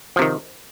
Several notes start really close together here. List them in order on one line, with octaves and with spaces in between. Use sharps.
F3 C3 D#3